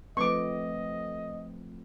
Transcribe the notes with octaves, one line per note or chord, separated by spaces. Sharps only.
F3 A3 C4 B4 D#5 C#6 D6